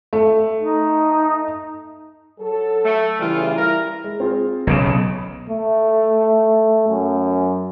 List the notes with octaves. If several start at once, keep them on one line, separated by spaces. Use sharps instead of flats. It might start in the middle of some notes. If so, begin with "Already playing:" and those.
A3
D#4
F#3 A4
A3
C#3 E3 G3 F4
G3 E4 A#4
G#3
C4 F4 G#4
B1 C#3 A#6 E7
A3
F#2